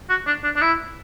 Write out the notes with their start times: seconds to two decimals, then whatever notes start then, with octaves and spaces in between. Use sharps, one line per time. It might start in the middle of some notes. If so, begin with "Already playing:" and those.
0.10 F#4
0.27 D4
0.44 D4
0.56 D4
0.61 E4